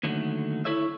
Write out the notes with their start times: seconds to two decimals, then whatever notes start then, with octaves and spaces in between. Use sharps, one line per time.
0.03 D#2 D3 F#3 A3
0.65 E4 A4 C#5 E5